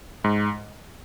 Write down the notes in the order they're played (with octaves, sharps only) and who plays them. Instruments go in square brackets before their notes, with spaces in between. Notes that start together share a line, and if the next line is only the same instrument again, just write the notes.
[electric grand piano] G#2